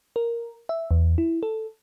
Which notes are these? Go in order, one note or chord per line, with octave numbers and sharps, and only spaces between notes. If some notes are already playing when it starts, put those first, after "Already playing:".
A#4
E5
E2
E4
A4